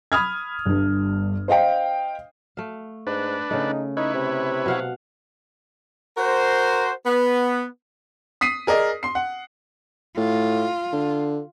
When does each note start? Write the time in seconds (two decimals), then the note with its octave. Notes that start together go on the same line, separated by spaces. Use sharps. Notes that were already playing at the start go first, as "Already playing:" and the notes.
0.12 B5 D#6 F6 G#6
0.66 G1 G2
1.48 C5 D#5 F5 G5
2.57 A3 F5
3.07 G#2 D4 B4
3.51 C#3 A3 D#4
3.97 D#4 E4 B4 C#5
4.15 C3
4.66 B2 F5 F#5
6.18 F#4 A#4 C5
7.06 B3
8.41 D#6 B6 C7 D#7
8.67 G#4 A#4 D5 D#5
9.03 C6 C7
9.15 F#5
10.17 A2 F4
10.93 D3